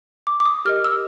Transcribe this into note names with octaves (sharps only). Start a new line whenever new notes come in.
D6
D6
D#6
G4 A#4 D#5 F6
E6